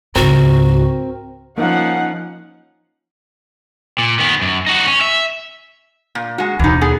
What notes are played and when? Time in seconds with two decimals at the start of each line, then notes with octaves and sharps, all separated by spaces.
0.16 C#2 G#2 C4 F#4 A#4
1.58 F3 A#3 C#4 D#4 F#5
3.98 A#2
4.19 D#3 B3
4.42 F#2
4.67 D#4 F#4
4.87 C#4
5.01 E5
6.15 A#2
6.38 G#3 F#4
6.59 D#2 B2 E3 D#4
6.81 B3 G#4 G#5